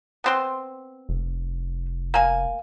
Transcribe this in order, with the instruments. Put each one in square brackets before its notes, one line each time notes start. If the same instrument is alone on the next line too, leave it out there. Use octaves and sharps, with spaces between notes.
[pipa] B3 C4 C6
[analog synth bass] F1
[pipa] A#3 G#5